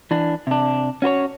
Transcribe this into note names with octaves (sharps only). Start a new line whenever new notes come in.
E3 D4
C3 D4
C#4 F#4 C5 C#5